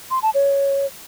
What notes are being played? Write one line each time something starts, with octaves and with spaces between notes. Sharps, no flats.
C6
A5
C#5